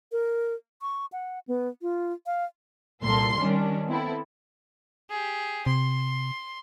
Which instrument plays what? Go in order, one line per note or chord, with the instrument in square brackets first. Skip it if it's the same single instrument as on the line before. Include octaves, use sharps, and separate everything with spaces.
[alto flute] A#4
C#6
F#5
B3
F4
F5
[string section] C2 A#2 A#3 A4 C6
D#3 G3 C#4 D4
B3 C4 E4 A4
[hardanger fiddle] G4 G#4
[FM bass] C3 [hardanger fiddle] C6